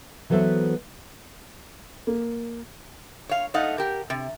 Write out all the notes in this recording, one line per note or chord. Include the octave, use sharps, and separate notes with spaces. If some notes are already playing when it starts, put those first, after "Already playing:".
E3 F#3 B3 A4 C5 E5
A#3
C#5 F5
A3 D#4 D#5 F5 F#5
G4 A#4
C3